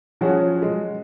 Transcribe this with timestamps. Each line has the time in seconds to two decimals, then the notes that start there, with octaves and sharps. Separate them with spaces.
0.21 F3 F#3 C#4 F#4 G#4
0.62 G#3